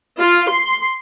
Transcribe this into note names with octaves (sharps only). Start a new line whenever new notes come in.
F4
C6